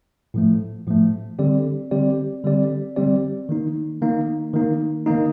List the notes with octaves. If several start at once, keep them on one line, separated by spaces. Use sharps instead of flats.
A2 F3 A3
A2 F3 A3
D3 G3 C4 G4 D5
D3 G3 C4 G4 D5
D3 G3 C4 G4 D5
D3 G3 C4 G4 D5
D#3 A#3 D#4
D#3 A#3 D#4
D#3 A#3 D#4
D#3 A#3 D#4